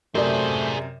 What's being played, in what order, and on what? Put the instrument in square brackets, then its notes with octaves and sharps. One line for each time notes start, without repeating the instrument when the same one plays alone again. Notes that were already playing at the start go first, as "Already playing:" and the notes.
[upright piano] F#2 C3 [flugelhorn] A3 [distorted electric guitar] G#4 C5 [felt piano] A#4 D5